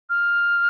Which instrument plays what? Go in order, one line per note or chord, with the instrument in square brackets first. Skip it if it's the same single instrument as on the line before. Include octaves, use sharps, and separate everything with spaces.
[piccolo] F6